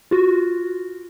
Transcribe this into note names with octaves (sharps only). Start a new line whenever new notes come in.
F4 F#4